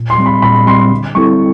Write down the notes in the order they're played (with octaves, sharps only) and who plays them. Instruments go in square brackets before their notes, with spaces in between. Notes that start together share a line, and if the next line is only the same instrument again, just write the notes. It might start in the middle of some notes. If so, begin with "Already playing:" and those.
Already playing: [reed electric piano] A#2
[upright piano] C6
[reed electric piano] G3 C4
[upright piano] B5
[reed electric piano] A#2 [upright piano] B5
[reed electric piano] G3 C4 [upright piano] C6
[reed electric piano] D3
[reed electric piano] G3 C4 E4 A4 [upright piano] C#6